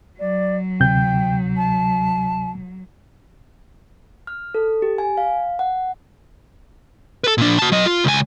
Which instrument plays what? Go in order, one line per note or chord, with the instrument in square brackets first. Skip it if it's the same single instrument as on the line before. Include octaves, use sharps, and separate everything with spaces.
[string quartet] F#3 [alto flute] D5
[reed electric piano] D2 C3 G6 [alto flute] G5
[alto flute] A5
[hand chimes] F6
A4
G4
G#5
F5
F#5
[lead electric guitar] A4 B4
A#2 D4
F#4 A5
F#3 D#5
F4
C#2 G#5